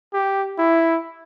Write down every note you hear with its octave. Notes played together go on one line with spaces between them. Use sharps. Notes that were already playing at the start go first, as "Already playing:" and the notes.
G4
E4